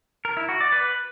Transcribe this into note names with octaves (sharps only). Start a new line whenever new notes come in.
A#4
E4
F#4
D5
B4